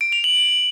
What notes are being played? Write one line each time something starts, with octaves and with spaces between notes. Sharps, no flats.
D7
F7
F#7